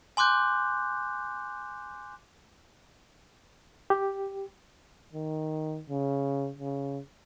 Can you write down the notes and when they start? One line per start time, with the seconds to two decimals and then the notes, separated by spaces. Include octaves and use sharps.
0.17 G#5 C6 D6 F#6 G6
3.90 G4
5.13 D#3
5.90 C#3
6.59 C#3